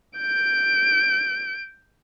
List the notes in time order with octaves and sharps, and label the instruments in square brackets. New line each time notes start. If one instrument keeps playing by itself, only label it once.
[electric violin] G6 D7